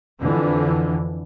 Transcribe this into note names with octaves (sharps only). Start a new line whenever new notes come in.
F2 D3 E3